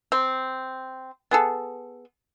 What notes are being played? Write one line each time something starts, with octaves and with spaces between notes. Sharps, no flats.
C4
B3 G#4 A4